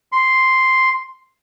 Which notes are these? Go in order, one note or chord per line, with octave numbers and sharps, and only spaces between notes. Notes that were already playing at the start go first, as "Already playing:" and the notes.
C6